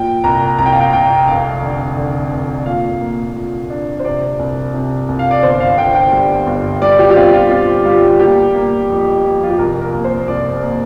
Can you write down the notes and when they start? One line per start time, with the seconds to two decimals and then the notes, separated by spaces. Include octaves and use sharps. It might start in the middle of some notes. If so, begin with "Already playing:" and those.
Already playing: A#2 G5
0.24 C2 A#5
0.58 C2 A#5
0.66 G5
0.72 F5
0.80 G5
0.93 C2 G5
1.28 F1 F5
1.62 D3
1.97 D3
2.32 F1
2.66 A#2 F5
3.01 A#3
3.35 A#2
3.70 D4
4.00 C5
4.04 C3 D5
4.39 C2
4.74 C3
5.08 C2
5.19 F5
5.31 D5
5.43 G1 C5
5.60 F5
5.78 D3 G5
5.95 G5
6.12 G3
6.47 G1
6.82 G3 D5
6.99 G4
7.10 G4
7.16 C4 F4
7.34 F4
7.50 C4 F4
7.85 G3 F4
8.20 A#3 G4
8.55 A#3
8.89 F2
9.25 F3
9.43 F4
9.51 G4
9.59 C2 A#4
9.81 A#4
9.93 A#3
10.04 C5
10.28 C2 D5
10.62 A#3